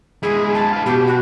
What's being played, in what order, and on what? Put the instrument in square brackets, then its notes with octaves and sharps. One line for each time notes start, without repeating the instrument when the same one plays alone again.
[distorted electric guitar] G#3 E4 [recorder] G#4
[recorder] A5
[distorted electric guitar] B4 F5
[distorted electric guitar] B2 [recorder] G4
[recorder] F#4